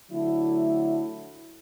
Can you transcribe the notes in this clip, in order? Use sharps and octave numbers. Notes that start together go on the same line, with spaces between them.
D3 F#3 A3 E4